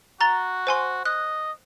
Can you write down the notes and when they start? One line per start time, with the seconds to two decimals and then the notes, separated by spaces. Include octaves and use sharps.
0.21 F#4 A#5 A6 G7
0.67 C5 G#5 C6
1.05 D#5 F#6